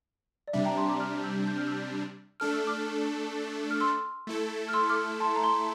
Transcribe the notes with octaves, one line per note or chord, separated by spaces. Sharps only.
D5
C3 G3 D4 E5
G5 A#5
A5 C6
A#5 D6
D6 F6
E6 G6
G6
F6
E6 G6
A3 D4 A4 F6
E6
D6 F6
F6
C6 E6
A3 E4 A4
F6
C6 E6
D6 F6
A5 C6
A#5
A5 C6